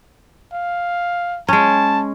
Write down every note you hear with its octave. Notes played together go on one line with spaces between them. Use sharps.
F5
G#3 C#4 A5